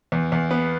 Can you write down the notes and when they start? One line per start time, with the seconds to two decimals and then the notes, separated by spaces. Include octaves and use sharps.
0.12 E2
0.32 E2
0.51 B3